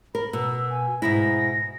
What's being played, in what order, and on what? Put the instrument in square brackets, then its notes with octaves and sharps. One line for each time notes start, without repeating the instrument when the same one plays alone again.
[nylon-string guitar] A#4 [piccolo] B5
[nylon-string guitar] B2 [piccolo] E6
[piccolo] G#5
[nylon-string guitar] G#2 B2 E4 [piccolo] A#6